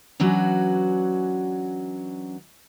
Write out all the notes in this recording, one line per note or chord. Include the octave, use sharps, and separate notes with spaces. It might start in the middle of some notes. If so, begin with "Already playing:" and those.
E3 F#3 C#4 D4 F#4